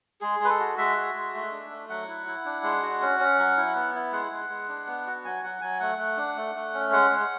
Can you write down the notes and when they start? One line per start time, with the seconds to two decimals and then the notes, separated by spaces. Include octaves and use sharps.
0.21 G#3 G#4
0.40 G#3 B4
0.50 A4
0.59 F#4
0.78 G#3 E5
0.96 F#4
1.14 G#3
1.34 A3
1.51 D4
1.70 A3
1.90 F#3 F#5
2.08 E4
2.27 E4
2.45 D4
2.63 G#3
2.82 F#4
3.01 C#4
3.19 C#4
3.38 F#3
3.57 E4
3.75 B3
3.94 E4
4.12 G#3 F#5
4.31 G#3
4.49 G#3
4.68 D4
4.87 B3
5.06 F#4
5.25 F#3 G#5
5.44 F#3 F#5
5.61 F#3 G#5
5.80 A3 F#5
5.98 A3
6.17 D4
6.37 A3
6.55 A3
6.74 C#4
6.91 G#3 F#5
7.10 G#3
7.20 F#5